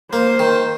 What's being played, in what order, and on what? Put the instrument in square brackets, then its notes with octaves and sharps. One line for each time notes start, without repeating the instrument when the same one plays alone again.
[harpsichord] A#3 [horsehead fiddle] C5
[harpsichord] D#3